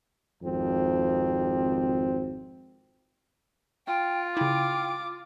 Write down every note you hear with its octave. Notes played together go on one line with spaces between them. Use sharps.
G#1 F2 C4
F4 G5
C#3 E4 G5 D6